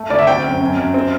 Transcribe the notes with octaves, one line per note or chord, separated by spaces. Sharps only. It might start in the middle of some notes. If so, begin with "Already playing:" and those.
Already playing: A3
D2 D5
E5
C4 G5
F#2
F#2
F#2
C4